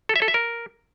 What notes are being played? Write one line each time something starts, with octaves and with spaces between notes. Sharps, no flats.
A4
E5
A4
E5
A#4